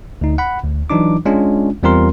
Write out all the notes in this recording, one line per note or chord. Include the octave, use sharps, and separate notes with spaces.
D2 D#4
F#5 B5
D2
E3 F#3 D4 D#4 D6
G#3 C#4 D4 F4
E2 G3 C4 F4 A#4 C6